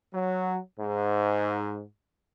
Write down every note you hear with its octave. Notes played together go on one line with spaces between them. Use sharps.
F#3
G#2